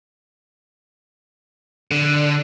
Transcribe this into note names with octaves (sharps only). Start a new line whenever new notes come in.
D3